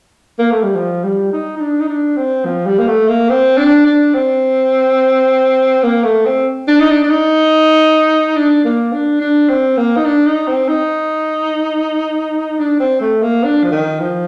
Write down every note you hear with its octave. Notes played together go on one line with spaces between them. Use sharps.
A#3
A3
G3
F3
G3
D#4
D#4
D4
D#4
D4
C4
F3
G3
A#3
A3
A#3
C4
D4
D4
C4
A#3
A3
C4
D4
D#4
D4
D4
D#4
D4
A#3
D4
D4
C4
A#3
D#4
D4
D#4
C4
D#4
D4
C4
A3
A#3
D4
F3
D#3
F3